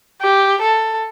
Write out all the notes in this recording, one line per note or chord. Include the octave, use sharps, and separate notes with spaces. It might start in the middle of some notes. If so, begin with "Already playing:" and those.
G4
A4